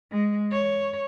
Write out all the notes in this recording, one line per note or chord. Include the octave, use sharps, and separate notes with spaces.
G#3
C#5